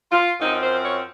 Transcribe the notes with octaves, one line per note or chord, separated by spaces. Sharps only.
F4
F#2 F3 C4 D#4
C5
C#5